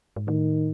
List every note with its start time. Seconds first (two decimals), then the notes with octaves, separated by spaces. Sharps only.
0.16 G#2
0.27 A2 D#3